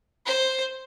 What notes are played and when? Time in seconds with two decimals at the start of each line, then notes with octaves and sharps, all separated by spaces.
0.26 C5